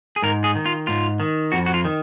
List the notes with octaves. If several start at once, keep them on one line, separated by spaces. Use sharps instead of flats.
G#4
G#2 A#4
G#4
D#3
F4
G#2 F4
D#3
F2 F#4
F#4
F4
D#3